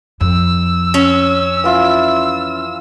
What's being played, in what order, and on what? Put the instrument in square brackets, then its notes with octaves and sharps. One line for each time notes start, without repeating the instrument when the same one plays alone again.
[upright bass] F2 [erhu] E6
[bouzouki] C#4
[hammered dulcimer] E3 F4 E5